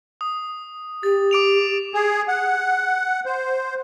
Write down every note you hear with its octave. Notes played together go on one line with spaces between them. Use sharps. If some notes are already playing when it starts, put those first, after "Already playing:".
D#6
G4 A6
D6 D7 F7
G#4
F#5
C5